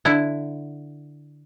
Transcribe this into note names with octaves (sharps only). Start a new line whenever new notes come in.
D3 E4